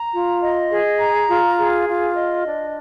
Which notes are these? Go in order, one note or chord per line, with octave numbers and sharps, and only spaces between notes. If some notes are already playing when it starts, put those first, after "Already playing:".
Already playing: A#5
F4
D#5
G#4
A#5
F4
G#4
F4
D#5
D4